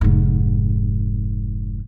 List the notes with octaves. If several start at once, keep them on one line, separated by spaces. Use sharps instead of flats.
F1 G#2